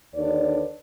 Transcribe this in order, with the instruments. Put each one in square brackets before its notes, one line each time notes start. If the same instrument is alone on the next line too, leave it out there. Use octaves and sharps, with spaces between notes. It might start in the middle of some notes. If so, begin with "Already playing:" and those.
[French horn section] D#2 D3 D4 B4 C#5 D5